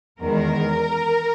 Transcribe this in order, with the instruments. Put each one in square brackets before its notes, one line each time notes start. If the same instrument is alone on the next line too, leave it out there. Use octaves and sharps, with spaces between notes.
[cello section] E2 D#3 G#3 A#4